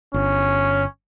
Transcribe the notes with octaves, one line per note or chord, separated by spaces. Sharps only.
G1 C#4